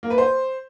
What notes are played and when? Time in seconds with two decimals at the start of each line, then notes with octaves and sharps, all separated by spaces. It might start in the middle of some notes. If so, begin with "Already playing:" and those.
0.03 A#3
0.10 B4
0.18 C5